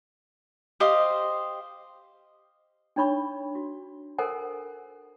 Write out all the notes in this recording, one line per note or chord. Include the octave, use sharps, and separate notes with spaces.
G4 C5 D#5 F5
D4 D#4 C#5 B5 C#6
F#4
A4 A#4 C5 F#5 G#5